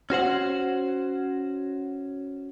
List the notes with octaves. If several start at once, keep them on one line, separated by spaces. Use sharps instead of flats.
C#4 F#4 C5 F#5